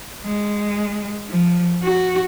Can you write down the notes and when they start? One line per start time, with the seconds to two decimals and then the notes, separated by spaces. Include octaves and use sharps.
0.25 G#3
1.30 F3
1.83 F#4